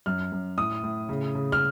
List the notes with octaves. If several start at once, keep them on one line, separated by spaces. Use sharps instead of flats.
F#2 F6
F#2
A2 D#6
A2
C#3
C#3
F6